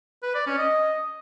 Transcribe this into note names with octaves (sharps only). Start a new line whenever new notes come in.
B4
D5
C#4
D#5